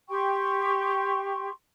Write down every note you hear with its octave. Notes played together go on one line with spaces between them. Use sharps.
G4 G5 C6 C#6